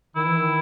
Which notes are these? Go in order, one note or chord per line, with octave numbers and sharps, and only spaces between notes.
D#3 E4
E3
D#3